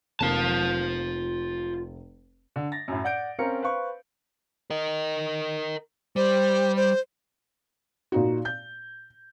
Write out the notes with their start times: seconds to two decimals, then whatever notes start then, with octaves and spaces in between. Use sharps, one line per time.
0.21 F1 A#3 F4 A5
2.56 D3
2.72 A6 A#6
2.88 F#2 A2
3.04 D5 F#5 G6 D7
3.39 C4 C#4 A#4 F5 A#5 C#7
3.63 B4 C5 F5 C#6
4.70 A#4 D#5
6.16 G3 C5
6.76 C5
8.12 A#2 D#4 F#4
8.45 G6